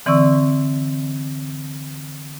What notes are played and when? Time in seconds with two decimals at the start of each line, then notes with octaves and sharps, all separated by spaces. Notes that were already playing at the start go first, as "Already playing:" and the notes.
0.06 D3 E3 C4 D5 C#6 E6